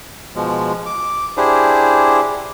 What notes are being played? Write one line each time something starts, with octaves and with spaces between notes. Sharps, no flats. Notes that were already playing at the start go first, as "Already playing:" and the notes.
B2 F3 G#3
D6
D4 E4 G4 G#4 C5